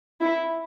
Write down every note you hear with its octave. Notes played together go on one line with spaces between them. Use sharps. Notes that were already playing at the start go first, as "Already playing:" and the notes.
E4